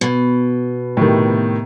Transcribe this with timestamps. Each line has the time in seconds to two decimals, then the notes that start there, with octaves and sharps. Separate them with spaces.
0.01 B2
0.97 A2 C3 D#3